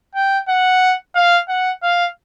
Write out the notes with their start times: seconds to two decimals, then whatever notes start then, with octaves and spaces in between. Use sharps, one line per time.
0.15 G5
0.48 F#5
1.15 F5
1.48 F#5
1.83 F5